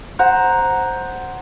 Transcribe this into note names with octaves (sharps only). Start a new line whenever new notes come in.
C5 F#5 A#5